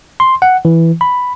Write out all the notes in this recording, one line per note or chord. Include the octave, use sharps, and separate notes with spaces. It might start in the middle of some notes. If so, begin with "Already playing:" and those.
C6
F#5
E3
B5